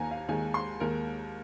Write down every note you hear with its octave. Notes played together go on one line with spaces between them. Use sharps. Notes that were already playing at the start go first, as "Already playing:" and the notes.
Already playing: D#2 D#3 A#3 G#5 A#5
F5
D#2 D#3 G#3 G#5
C6
D#2 D#3 G#3 A#4